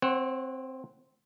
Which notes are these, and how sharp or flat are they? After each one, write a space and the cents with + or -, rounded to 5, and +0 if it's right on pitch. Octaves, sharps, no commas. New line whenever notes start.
C4 +0 C#5 -40 F#5 +0